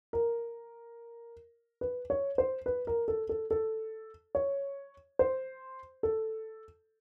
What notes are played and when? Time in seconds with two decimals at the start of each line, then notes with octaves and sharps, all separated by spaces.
0.13 A#4
1.81 B4
2.10 C#5
2.38 C5
2.66 B4
2.87 A#4
3.08 A4
3.29 A4
3.51 A4
4.35 C#5
5.19 C5
6.03 A4